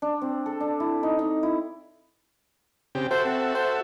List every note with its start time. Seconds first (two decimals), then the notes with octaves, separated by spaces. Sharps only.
0.02 D4
0.22 C4
0.46 A4
0.60 D4
0.80 E4
1.03 D#4
1.19 D#4
1.43 E4
2.95 C#3 C4 G4
3.11 F#4 A4 C5 E5
3.24 C4
3.55 C5